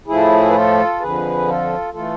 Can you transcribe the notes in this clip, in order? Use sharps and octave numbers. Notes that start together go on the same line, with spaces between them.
A2 F3 A3 E4 G#4
B4
F4 A4
F2 D3 F3 G#4 B4
F4 A4
E3 A3 F4 A4